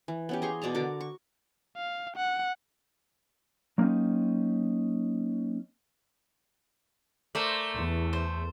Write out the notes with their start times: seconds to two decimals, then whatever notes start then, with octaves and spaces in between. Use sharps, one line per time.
0.08 E3
0.29 B3 C#4 G4
0.42 G#4 A#5 C6 C#6
0.62 B2 D5 A5 A#5
0.75 D3 F#4 A#4 D6
1.01 C#6
1.77 F5
2.16 F#5
3.78 F#3 A#3 C4 C#4 D#4
7.35 A3 A#4 C5 D5
7.74 E2
8.13 C5